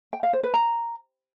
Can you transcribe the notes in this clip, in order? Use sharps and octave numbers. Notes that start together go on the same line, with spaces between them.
G5
F5
C5
B4
A#5